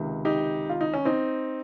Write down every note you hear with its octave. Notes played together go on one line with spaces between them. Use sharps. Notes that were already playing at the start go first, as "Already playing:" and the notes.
Already playing: C#2 C3 D#3
D#4 G4
F4
D#4
C#4
C4 D#4